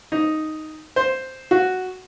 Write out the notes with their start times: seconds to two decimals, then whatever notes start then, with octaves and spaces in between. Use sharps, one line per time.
0.12 D#4
0.96 C5
1.51 F#4